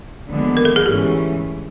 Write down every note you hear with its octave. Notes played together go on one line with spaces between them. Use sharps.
D#2 D3 F3 G#3 B3
A#4
A4
G#4
G#2 E3 A3 C#4 G4